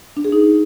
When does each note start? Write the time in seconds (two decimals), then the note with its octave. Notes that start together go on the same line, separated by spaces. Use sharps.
0.17 D4
0.25 G#4
0.32 D#4